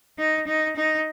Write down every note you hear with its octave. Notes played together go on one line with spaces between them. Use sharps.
D#4
D#4
D#4